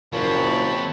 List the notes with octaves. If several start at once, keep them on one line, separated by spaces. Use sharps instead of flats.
F#1 A#2 F3 C4 C#5 A5 B5